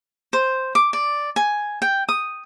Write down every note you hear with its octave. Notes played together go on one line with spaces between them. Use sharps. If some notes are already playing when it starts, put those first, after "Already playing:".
C5
D6
D5
G#5
G5
D#6